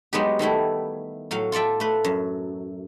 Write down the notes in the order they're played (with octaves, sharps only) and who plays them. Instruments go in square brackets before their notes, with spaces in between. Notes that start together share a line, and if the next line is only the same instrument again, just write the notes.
[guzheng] F#3 G#3 B3 D#4 G4
D#3 G3 A3 E4
A2 F#3 F5
F4 A4 D5 E5 G5
A3 B4
F#2